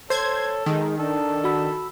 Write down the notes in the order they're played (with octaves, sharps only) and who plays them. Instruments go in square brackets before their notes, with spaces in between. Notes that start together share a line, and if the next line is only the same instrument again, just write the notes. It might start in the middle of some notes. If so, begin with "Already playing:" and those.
[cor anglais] A4 [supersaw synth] C5 G#6 [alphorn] C#5
[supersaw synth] D#3 [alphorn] G#3
[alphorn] D4 [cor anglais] A4
[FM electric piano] F#4 B5 E6